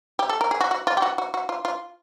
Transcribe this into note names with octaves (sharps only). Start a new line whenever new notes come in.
G4
A4
A#4
G#4
F#4
F#4
F4
G4
F#4
F#4
F#4
F4
F4